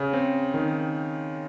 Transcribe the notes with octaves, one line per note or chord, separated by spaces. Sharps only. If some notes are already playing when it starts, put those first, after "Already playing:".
Already playing: C#3
C4
D#3